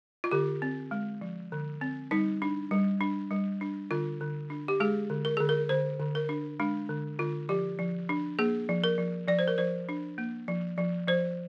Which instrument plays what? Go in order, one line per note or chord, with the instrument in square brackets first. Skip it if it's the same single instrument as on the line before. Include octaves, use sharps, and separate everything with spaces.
[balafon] F4
D3 G4
C4
G#3
F3
D3
C4
G3 D#4
D4
G3
D4
G3
D4
D3 F4
D3
D4
G4
G#3 G#4
D3
A#4
D3 G#4
A#4
D3 C5
D3
A#4
D4
G#3 D4
D3
D3 F4
F3 G4
F3
D4
A#3 G#4
F3
A#4
F3
F3 D5
C5
A#4
F3 C5
D4
A#3
F3
F3
F3 C5